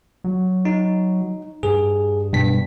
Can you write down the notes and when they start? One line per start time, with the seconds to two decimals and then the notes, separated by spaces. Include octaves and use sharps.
0.24 F#3
0.65 D#4
1.63 G2 G#4
2.33 G2 B2 B6